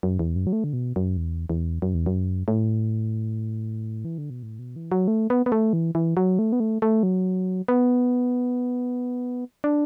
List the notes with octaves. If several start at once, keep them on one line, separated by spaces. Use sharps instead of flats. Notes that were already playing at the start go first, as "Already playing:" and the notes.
F#2
E2
F#2
F#3
A3
D3
B2
F#2
E2
E2
F#2
E2
F#2
A2
E3
D3
B2
A2
B2
E3
F#3
A3
B3
B3
A3
E3
E3
F#3
A3
B3
A3
A3
F#3
B3
D4